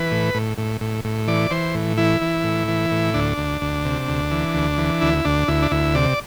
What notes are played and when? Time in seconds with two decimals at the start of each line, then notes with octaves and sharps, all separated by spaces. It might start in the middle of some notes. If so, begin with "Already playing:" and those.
Already playing: E3 B4
0.11 A2
0.34 A2
0.58 A2
0.81 A2
1.05 A2
1.28 E3 D5
1.51 E3 C5
1.74 A2
1.97 E3 E4
2.21 E3
2.44 A2
2.68 E3
2.91 A2
3.14 D2 D4
3.37 D2
3.62 D2
3.85 C3
4.08 D2
4.31 E3
4.55 D2
4.78 E3
5.01 D2 E4
5.25 D2 D4
5.48 D2 E4
5.62 D4
5.71 D2 E4
5.94 C3 D5